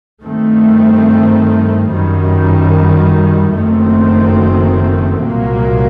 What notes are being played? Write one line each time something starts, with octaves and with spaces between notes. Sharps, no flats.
G2 D#3 A3 C4
F#2 D#3 G3
F#1 F#2 D#3 A3 C4
C2 A#2 F#3 A#3